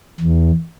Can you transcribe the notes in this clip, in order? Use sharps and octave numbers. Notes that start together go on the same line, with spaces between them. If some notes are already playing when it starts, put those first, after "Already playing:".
E2